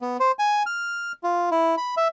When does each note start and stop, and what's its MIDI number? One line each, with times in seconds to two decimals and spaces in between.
0.02 0.17 59
0.20 0.32 72
0.39 0.63 80
0.66 1.12 89
1.23 1.49 65
1.51 1.75 64
1.78 1.95 83
1.97 2.08 76